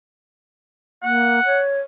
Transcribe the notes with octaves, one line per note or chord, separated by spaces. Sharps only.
A#3 F#5
C#5